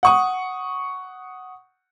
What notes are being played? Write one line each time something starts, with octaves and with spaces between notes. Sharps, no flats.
F#5 C#6 D#6